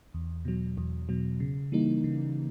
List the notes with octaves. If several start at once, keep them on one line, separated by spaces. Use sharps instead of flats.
E2
B2 F#3
E2
B2 F#3
C#3
E3 G3 A#3 D#4
C#3